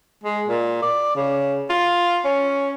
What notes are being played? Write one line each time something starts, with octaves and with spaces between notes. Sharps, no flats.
G#3
A#2
D5
C#3
F4
C#4